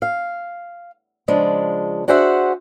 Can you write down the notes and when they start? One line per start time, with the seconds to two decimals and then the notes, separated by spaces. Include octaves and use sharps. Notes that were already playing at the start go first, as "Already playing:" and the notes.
0.02 F5
1.28 C#3 F3 G#3 D4
2.08 D4 F#4 G#4 C5 E5 F#5